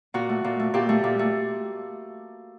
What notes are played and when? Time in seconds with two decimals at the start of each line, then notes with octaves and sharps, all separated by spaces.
0.14 A#2 F#4
0.29 A3
0.44 A#2
0.60 A3
0.74 A#2 G4
0.89 A3
1.04 A#2
1.19 A3